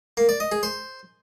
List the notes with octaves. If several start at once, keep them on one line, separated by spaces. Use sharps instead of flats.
A#3
D5
D#5
G#4
C5